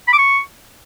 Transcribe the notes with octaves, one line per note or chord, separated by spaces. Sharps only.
B5
D6
C#6